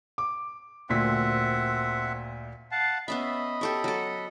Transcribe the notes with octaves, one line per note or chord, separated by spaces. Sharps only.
D6
D2 A#2 C4 E5 F#5 B6
F5 F#5 A5
B3 C#4 D#5 E5 B5
G4 A4 C#5
F#3 A4